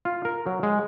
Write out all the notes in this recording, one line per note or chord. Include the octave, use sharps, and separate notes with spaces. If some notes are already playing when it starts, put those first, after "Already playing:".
F4
A#4
F#3
G#3